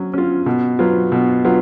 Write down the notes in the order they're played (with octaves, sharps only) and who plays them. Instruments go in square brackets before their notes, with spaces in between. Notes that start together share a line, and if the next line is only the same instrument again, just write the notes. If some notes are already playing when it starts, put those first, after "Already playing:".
Already playing: [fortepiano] F#3 C#4
C#4 F4
B2
F#3 B3 F4
B2
F#3 B3 F4